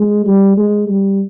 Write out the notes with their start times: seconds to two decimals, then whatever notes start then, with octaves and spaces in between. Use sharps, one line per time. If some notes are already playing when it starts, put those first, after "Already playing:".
Already playing: G#3
0.26 G3
0.57 G#3
0.88 G3